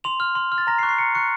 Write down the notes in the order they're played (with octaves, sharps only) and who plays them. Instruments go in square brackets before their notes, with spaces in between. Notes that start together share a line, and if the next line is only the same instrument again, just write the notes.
[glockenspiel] C6 F7
F6
C6
F6
A6
A#5 A#6
C7
C#6 F#6
C7
A#5 C#7
C#6 F#6 C#7